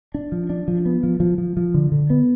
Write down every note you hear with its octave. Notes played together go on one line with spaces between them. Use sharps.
D4
F3
D4
F3
B3
F3
F3
F3
F3
D3
D3
B3